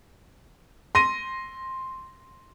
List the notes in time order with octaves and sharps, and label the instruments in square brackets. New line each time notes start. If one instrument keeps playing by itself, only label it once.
[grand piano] C6 A#6 D#7